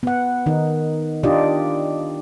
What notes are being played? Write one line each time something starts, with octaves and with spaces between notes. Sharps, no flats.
B3 F#5
D#3 D#4
D4 D#4 F4 G4 D5 D#5